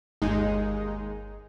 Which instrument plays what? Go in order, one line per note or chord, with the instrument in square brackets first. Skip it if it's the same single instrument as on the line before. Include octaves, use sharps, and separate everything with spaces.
[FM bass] G1 [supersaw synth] D#2 G#3 D#4